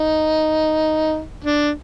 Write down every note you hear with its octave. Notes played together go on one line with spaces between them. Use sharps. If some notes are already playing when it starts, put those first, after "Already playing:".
Already playing: D#4
D4